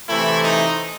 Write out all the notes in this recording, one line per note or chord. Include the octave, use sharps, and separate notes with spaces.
C3 E3 A3 C4 E4
D#4